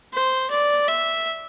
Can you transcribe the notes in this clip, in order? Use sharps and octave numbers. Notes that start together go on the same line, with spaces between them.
C5
D5
E5